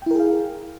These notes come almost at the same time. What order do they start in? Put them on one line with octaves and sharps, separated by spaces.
G5 E4 A#4 G#4 F5